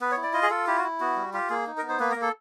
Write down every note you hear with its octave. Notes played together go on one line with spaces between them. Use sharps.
B3 B4
C#5
E4
D5
F4 D#5
G#4
F4 A4
E4 G4
F#4
E4
B3 F#4
G3
F4 G4
A#3 G#4
D#4
A#4
B3
C5
A#3 B4
A#3 A#4
A4